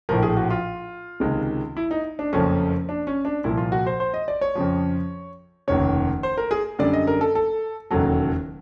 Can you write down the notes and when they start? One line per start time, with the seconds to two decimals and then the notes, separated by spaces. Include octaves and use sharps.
0.09 A#1 A2 F3 A#4
0.23 G#4
0.37 F#4
0.50 F4
1.20 C#2 C3 D#3 G#3
1.77 E4
1.91 D#4
2.19 D4
2.32 F#1 F2 C#3 F3 A3 C#4
2.89 D4
3.07 C#4
3.25 D4
3.44 C2 A#2 F3 E4
3.57 F4
3.72 F#4
3.87 C5
4.00 C5
4.14 D#5
4.28 D5
4.41 C#5
4.55 F2 C#3 F3
5.68 F1 D#2 C#3 C#5
6.23 C5
6.38 A#4
6.51 G#4
6.79 F#2 D3 G3 D5
6.93 D#5
7.07 A#4
7.21 A4
7.35 A4
7.91 E1 D#2 C#3 F#3 A4